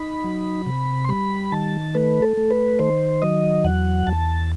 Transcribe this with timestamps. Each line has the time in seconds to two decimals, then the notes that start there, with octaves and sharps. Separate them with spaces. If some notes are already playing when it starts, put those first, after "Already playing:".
Already playing: D#4 B5
0.24 F#3
0.66 C3
1.05 C6
1.09 G3 B5
1.52 D#3 A5
1.95 A3 B4
2.22 A4
2.37 A3
2.51 B4
2.79 D#3 C5
3.22 F#3 D#5
3.64 E2 F#5
4.07 E2 A5